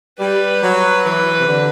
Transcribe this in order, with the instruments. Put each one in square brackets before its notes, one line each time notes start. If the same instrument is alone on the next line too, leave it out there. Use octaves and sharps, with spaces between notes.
[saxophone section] G3 [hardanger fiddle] B4
[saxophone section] F#3
E3
C3
D3